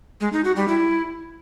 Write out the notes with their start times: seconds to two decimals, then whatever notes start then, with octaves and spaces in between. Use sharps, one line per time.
0.21 G#3
0.33 D#4
0.44 F#4
0.56 G3
0.68 E4